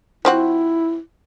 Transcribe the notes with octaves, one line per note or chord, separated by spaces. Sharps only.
F3 C4 E4 F#4